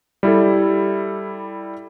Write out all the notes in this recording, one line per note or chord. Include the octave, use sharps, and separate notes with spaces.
G3 E4 G4 A4